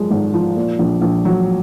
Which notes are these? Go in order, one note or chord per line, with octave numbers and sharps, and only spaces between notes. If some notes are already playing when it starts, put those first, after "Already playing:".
Already playing: F#2 F3 G#3
G#1
F3
A#2
A#1
A#1
F#3